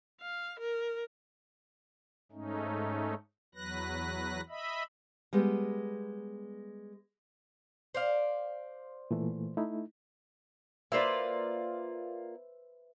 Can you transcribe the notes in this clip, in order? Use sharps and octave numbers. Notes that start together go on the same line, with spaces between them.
F5
A#4
G#2 A3 C#4 D#4
E2 F#3 B4 F#6 A#6
D#5 E5 B5
G3 G#3 B3
C5 D5 F5
A#2 E3 A3
A3 D#4 E4
A#3 F4 B4 C5 D5 E5